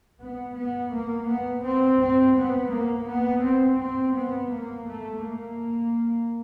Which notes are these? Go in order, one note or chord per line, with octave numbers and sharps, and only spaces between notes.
B3
B3
A#3
B3
C4
C4
B3
A#3
B3
C4
C4
B3
A#3
A3
A#3